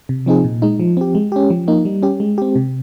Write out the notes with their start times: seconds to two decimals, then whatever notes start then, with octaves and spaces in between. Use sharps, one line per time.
0.09 C3
0.26 F3 C4 D#4 G#4
0.44 A#2
0.62 G#3 D#4
0.80 F3
0.97 C4 G4
1.15 G#3
1.32 C#4 G4
1.50 F3
1.68 A#3 D#4
1.85 G3
2.03 C#4 G4
2.20 G#3
2.38 C4 G4
2.55 C3